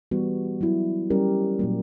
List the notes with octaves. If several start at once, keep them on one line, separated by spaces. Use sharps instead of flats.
E3 G3 B3 F#4
F#3 B3 E4
G3 C#4 G4 A#4
A#2 F#3 A#3